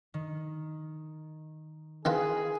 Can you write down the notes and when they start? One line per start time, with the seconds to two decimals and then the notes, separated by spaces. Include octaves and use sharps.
0.14 D#3
2.05 D#3 E4 F4 G#4 B4